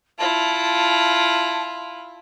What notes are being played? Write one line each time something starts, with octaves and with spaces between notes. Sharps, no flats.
E4 F4 A5